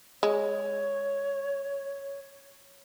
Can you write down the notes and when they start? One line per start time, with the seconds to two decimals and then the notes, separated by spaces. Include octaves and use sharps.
0.23 G#3 C#5